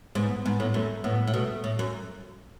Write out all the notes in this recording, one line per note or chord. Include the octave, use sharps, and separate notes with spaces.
G#2 B3
G#2 B3
A2
F#2 A3
A2 B3
A2
B2 A3
A2
F#2